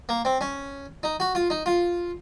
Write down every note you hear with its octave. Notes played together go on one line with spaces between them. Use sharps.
A#3
C4
C#4
D#4
F#4
F4
D#4
F4